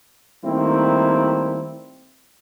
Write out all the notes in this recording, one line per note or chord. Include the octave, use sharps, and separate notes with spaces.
D#3 G3 A3 A#3 C4 E4